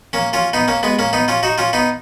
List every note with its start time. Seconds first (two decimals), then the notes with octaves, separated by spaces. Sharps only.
0.13 A#3 C#4
0.33 C#4 F4
0.53 B3 D#4
0.68 A#3 C#4
0.83 G#3 B3
0.99 A#3 C#4
1.13 B3 D#4
1.28 C#4 F4
1.43 D#4 F#4
1.58 C#4 F4
1.73 B3 D#4